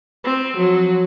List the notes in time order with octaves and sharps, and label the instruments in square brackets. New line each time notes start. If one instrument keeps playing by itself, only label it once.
[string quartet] C4
F3 F#3